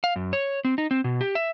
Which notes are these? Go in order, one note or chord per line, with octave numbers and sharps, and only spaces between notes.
F5
F#2
C#5
C4
D#4
C4
B2
G4
E5